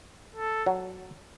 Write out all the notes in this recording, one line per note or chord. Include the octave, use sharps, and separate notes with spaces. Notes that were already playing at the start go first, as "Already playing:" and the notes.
A4
F#3